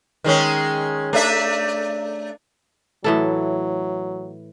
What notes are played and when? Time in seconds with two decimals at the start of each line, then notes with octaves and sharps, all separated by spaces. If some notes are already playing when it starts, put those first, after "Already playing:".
0.24 D#3 G#3 C#4
1.13 A3 D4 E5
3.04 A2 E3 F#3 A4